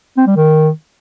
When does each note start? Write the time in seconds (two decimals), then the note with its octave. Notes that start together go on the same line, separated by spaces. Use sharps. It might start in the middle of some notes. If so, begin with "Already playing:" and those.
0.17 C4
0.27 G3
0.36 D#3